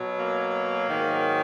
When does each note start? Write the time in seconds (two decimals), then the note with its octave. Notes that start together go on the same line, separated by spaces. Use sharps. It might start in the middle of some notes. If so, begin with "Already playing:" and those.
Already playing: B2 F#3
0.17 A#3
0.88 G#2 D#3 F#3